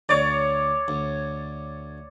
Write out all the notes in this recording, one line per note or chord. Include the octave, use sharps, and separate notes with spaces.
D2 C#5 D5 D6
D2